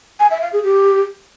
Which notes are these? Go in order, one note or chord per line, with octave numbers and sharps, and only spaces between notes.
G#5
E5
F5
G#4
G4